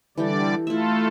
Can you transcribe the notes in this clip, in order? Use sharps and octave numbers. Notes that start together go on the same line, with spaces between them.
D3 E3 G3 G4 A4 D5
A3 E4 F4 A4 E5